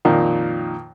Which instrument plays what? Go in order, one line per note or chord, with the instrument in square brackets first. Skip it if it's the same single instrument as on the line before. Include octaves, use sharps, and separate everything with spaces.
[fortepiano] F2 A#2 D#3 F3